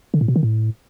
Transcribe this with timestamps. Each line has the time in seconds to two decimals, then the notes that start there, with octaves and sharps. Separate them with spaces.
0.14 D3
0.21 A2
0.28 B2
0.36 D#3
0.43 A2